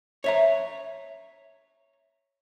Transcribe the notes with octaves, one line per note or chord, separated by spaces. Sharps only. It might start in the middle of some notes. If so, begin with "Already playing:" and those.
C#5 E5 A#5